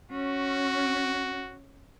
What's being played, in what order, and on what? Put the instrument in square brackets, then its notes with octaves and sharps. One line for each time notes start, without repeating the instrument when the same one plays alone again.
[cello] C#4 [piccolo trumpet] F#4